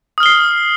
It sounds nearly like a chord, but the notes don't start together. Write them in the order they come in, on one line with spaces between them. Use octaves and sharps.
D#6 F6 G7 C7